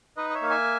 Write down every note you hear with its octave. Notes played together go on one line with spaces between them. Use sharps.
D#4 B4 D#5
D#5
C#5 E5
A#3
E5 G#5